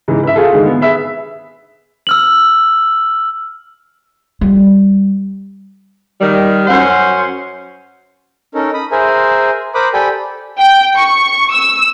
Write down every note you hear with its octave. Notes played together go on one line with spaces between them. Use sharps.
G#2 C#3 E3
B4 E5
F4 F#4 G#4 A4
D3 D#3 G#3
B3
G#4 B4 E5
E6 F6 F#7
G3
D#3 G3
F#2 C#4 C5 F#5
C#4 D#4 A4 A#4
B5 D#6
G#4 A#4 C5 E5 G#5
A#4 C5 B5 D6 D#6 F#6
G4 A4 D5 G5 G#5 B5
G5
C#6
E6